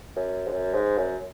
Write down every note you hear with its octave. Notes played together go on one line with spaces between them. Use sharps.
F#2
G#2
F#2
G#2
F#2